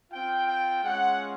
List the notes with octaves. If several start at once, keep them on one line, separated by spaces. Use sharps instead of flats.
C4 F4 G5
G5
G#3 C#4 F4 F#5